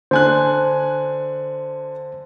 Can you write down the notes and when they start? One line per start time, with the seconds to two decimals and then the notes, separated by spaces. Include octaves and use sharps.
0.11 D3 C5 G#5 F#6